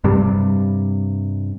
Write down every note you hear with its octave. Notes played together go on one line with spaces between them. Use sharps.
G2 C3 G3